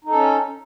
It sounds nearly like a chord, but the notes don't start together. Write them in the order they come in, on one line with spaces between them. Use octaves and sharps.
D#4 A4 C#4